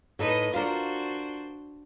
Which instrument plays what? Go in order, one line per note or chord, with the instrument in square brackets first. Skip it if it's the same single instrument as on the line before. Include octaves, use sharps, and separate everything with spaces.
[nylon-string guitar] A2 A4 [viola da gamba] D#4 B4 D#5
[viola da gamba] D4 F#4 C5 [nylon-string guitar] F4 A#4